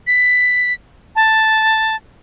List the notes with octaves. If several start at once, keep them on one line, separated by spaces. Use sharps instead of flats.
B6
A5